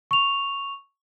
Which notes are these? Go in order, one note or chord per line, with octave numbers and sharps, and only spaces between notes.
C#6 F7